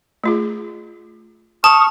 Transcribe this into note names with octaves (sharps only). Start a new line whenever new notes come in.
A3 F4 G#4
A5 C#6 D#6 F6